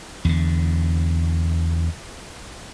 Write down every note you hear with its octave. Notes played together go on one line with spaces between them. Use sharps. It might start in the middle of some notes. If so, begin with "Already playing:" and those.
E2 D3